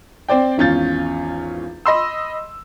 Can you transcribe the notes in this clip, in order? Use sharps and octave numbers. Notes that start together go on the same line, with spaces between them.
C4 C5 D5 G5
G#1 E2 C#4 F4 G6 A6
D#5 B5 C6 E6